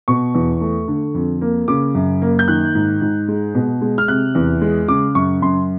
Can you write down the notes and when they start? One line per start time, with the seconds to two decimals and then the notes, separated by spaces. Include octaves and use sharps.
0.08 B2 C#6
0.34 E2
0.61 A3
0.88 D3
1.14 F2
1.41 A#3
1.68 C#3 D6
1.95 F#2
2.22 A#3
2.39 G6
2.48 D#3 F#6
2.75 G#2
3.01 G#2
3.28 G#3
3.55 B2
3.81 G#3
3.98 F6
4.08 C3 F#6
4.35 E2
4.61 G#3
4.88 C#3 D6
5.15 F#2 C#6
5.42 F#2 C6